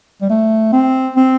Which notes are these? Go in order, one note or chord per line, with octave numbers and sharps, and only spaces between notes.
G3
A3
C4
C4